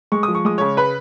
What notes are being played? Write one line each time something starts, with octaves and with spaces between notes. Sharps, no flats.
G#3 C#6
D#6
F3
C#6
G#3 D#6
C#3 C#5 C#6
B4 B5